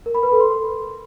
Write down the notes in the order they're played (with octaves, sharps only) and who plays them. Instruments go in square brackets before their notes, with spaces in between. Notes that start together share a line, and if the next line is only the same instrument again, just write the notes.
[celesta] A#4
B5
B4
A4
C6